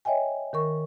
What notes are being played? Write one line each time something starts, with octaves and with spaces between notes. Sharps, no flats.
C#5 D#5 E5 G5 G#5
D#3 A#4 C#6